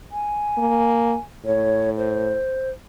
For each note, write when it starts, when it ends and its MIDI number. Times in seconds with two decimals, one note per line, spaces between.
0.12 1.18 80
0.58 1.15 58
1.46 2.40 45
1.46 1.90 73
1.97 2.70 72